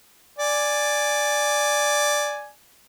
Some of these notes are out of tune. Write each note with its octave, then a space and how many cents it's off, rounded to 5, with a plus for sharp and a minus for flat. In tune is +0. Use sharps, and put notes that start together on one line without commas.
D5 +0 G#5 +0